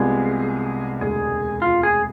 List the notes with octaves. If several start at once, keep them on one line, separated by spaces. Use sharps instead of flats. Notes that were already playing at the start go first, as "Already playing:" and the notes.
Already playing: C2 C3 G#3 B3 F4 G#4
E1 D2 C3 G#3 G#4
F4
G#4